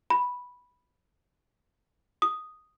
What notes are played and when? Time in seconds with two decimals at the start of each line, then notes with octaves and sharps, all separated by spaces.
0.10 B5
2.22 D#6